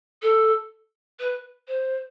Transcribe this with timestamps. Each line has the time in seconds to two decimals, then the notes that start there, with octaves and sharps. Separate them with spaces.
0.22 A4
1.19 B4
1.67 C5